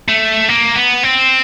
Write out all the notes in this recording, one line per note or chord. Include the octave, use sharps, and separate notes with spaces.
A3
A#3
B3
C4